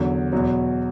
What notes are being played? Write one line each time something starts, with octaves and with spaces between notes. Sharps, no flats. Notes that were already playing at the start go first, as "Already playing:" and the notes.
Already playing: E2 D3 F#3
E2 B2 F#3